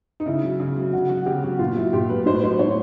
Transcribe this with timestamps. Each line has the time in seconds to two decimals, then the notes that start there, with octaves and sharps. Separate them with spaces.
0.20 D#4
0.26 C#3 E4
0.43 F#3
0.60 C#3
0.76 F#3
0.93 C#3 F#4
1.09 F#3 F#4
1.26 C#3 G4
1.43 F#3 F#4
1.59 A#2 F4
1.77 F#3 E4
1.93 A#2 G4
2.09 F#3 B4
2.26 A2 C5
2.35 B4
2.42 F#3 C5
2.59 A2 C#5